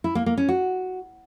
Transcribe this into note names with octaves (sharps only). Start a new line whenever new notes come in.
E4
A#3
A#3
C#4
F#4